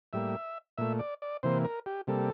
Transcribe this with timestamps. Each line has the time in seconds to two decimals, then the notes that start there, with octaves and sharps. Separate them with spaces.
0.13 A2 G3 A#3 E5
0.78 A#2 A3 E5
0.99 D5
1.22 D5
1.43 C3 E3 A#3 C5
1.64 A#4
1.86 G4
2.07 C3 G3 A#3 A4